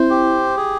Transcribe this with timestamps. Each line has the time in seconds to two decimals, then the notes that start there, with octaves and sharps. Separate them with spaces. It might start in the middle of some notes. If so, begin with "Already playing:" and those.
Already playing: C4 E4 C5
0.10 G4
0.57 G#4